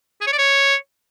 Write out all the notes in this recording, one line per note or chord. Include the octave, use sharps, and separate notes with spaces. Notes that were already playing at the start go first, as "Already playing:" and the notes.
G#4
C#5
D5
C#5